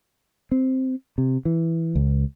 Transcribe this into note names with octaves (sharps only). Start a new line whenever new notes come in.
C4
C3
E3
C#2